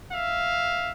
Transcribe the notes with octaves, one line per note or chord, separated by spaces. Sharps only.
E5 F5